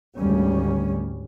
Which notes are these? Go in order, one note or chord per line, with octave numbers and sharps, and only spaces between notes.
G#1 D2 G3 C#4